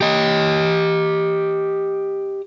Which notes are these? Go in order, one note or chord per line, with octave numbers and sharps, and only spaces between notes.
G4 D#5